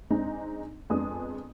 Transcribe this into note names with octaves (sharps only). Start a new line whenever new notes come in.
G#3 C4 D4 D#4
F2 G#3 B3 D4 D#6